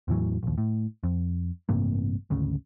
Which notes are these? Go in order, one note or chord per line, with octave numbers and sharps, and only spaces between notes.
E2 A2 E3 F#3
A#1 D#2
A2
F2
A1 G2 C3 A#3
G#1 D2 C#3